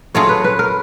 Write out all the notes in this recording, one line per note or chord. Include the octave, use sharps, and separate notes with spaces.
F#3 A3 C#4 F4 G#4 C#5
B4
B4
A#4